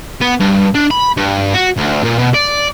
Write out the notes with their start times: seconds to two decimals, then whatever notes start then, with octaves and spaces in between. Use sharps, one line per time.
0.22 B3
0.40 G2
0.75 D4
0.91 B5
1.17 G2
1.54 F#4
1.76 D2
2.03 A#2
2.18 B2
2.34 D5